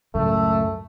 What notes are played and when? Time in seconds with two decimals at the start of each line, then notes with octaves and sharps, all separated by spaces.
0.15 C#2 F#2 A2 A3